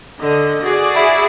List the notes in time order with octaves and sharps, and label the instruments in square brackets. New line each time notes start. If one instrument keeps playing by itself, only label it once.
[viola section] D3 D#5
F#4 G#4 D5
[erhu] E4